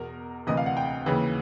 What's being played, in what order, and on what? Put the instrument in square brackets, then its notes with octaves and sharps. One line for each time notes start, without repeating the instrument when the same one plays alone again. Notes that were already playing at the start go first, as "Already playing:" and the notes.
Already playing: [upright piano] E2 B2 A#4
D2 C3 E3 D#5
F5
F#5
G5
D#2 C#3 E3